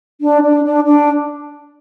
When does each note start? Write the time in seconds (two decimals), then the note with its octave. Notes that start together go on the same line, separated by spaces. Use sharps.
0.21 D4
0.42 D4
0.64 D4
0.85 D4